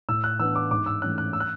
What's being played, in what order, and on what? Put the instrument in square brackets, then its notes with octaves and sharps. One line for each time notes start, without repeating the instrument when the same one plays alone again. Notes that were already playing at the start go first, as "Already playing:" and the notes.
[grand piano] A2 E6
F#6
E3 B3 D4 E6
D6
G#2 D6
E6
E3 A3 C#4 F#6
F#6
E6
F#6